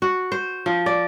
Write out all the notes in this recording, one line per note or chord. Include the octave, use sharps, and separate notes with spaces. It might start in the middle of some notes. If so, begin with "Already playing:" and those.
F#4
C5
F3
D5